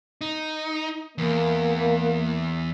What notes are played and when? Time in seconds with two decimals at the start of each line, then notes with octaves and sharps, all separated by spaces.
0.21 D#4
1.18 E2 A#3